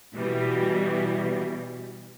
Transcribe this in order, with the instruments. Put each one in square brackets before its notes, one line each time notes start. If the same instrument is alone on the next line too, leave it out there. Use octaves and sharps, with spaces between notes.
[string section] B2 E3 G3